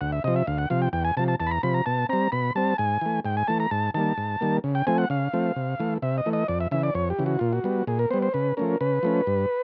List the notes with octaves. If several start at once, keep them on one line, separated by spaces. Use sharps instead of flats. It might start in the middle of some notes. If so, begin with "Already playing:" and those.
D2 F#5
E5
C3 F3 D#5
E5
D2 F5
F#5
C3 F3 F5
G5
E2 G5
G#5
C3 F3 A5
A5
E2 A5
B5
A#5
C3 F3 B5
A#5
B2 A5
G3 C4 A#5
B2 B5
G3 C4 A5
G#2 G#5
E3 A3
G#2 G5
G#5
E3 A3 A5
A#5
G#2 A5
D#3 G3 A#3 A5
G#2
D#3 G3 A#3
C#3
G5
F3 A3 C4 G#5
F#5
C#3 F5
F3 A3 C4
C3
E3 A3
C3 E5
D#5
E3 A3
D#5
F2 D5
E5
C#3 E3 E5
D5
F2 C#5
G4
C#3 E3
F#4
A#2 F4
F#4
G3 B3
A#2 G#4
A#4
G3 B3 C5
C5
C#3 B4
F3 A3 C#4 A#4
C#3 B4
F3 A3 C#4
G2